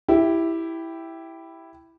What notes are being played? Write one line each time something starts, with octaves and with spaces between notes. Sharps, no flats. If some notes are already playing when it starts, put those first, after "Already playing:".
E4 G4